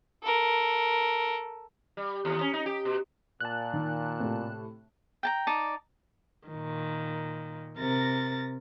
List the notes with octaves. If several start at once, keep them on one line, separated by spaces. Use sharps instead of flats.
A4 A#4
G3
D#2
C#4
D#4
G4
B2
A#2 A5 F#6
D#3
A2 C3 G4
G5 A5 A#5
D#4 D5 A5
A#2 D#3
C3 A#4 A6 A#6